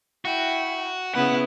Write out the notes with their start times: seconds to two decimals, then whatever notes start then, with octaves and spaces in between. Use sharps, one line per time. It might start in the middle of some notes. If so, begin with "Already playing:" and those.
0.25 E4 F#4 G5
1.15 C#3 B3 E4 B4 F#5